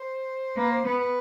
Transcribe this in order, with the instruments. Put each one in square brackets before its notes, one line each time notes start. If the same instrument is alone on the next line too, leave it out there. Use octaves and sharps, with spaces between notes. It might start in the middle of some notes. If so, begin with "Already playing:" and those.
Already playing: [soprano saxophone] C5
[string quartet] A#3 [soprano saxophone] B4
[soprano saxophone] C5
[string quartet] B3 [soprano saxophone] B4
[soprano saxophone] B4